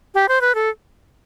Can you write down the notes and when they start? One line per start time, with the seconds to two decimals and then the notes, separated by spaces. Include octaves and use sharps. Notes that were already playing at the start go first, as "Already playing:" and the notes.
0.15 G4
0.29 C5
0.41 B4
0.55 A4